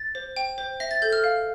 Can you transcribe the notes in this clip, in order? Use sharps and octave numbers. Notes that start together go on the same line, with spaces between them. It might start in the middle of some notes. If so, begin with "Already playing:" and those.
Already playing: A6
C5
G5
C5
E5 A#6
A6
A4 G6
F6
F5